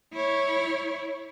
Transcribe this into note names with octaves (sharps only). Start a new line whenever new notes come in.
E4 C#5